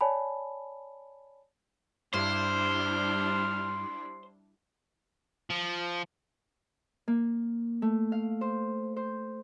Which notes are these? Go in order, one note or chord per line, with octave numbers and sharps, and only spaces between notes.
C#5 D5 G#5 A5 B5
G2 G3 D4 E4 C5 F6
F3
A#3
A3
F5
C5
C5